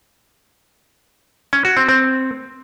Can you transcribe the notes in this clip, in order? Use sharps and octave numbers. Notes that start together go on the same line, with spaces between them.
C#4
F#4
C4
C4